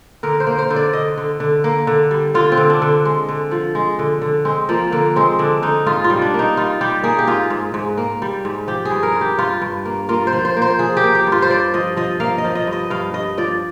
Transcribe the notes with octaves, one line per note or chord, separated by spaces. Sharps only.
D3 A#4
C5
A#3
C5
D3
D5
D3 D#5
D3
D3
A#3
D3
G3
D3 F4
C4
D3
D4
D3
G#3
D3
F3
G#3
D3
D3
G#3 C4
F3 A#3
D3 A#3
G#3 C4
D3 D4
D3 D#4
G#2 F4
F4
G3
D4
A#3
D#4
G3 F4
G3 G4
A#3 G#4
G4
G#2 F4
G#2
G#2
A#3
G3
G#2
F3 G4
G#4
G2
A#4
G2
G4
G2 F4
G2
A#3
A#3 F4
C5
F3
C5
A#3
C5
F3 G#4
G4
A#3
G4
G2
F4
C5
G2 D5
F3 D#5
F3 D#5
A#3 F5
D#5
F3
D#5
G2
D#5
G2 F5
G2 D#5
F3 D5